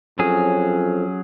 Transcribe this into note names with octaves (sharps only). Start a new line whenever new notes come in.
F2 F#3 C#4 G#4